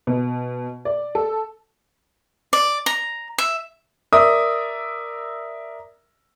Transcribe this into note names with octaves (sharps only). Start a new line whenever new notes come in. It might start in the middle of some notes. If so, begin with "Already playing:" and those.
B2
D5
A4
D5
A#5
E5
A#4 D5 E5 D#6